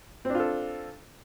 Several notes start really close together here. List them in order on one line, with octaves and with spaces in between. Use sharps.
C4 D4 F4 A4